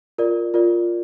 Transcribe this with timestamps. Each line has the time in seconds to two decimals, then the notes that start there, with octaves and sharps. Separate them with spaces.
0.18 F4 A#4 D5
0.54 F4 A#4 D5